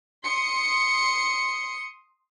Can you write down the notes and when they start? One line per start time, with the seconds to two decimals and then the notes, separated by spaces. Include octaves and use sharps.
0.25 C6 D#6 C#7